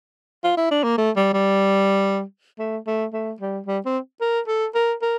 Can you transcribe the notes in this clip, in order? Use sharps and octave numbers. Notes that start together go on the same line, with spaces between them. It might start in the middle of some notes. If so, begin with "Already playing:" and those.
F4
E4
D4
A#3
A3
G3
G3
A3
A3
A3
G3
G3
C4
A#4
A4
A#4
A#4